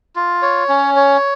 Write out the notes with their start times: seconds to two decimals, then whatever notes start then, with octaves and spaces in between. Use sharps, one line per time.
0.16 F4
0.42 C#5
0.69 C#4
0.96 C#5